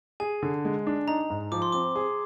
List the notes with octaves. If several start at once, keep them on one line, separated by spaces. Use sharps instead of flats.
G#4 G#5
D3
G#3
D4
D#4 A#5
G#2
F3 D6
C6
C4 D6
G#4